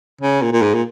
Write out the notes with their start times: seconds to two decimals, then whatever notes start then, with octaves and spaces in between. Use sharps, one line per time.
0.21 C#3
0.42 A#2
0.53 A#2
0.62 G#2
0.74 A#2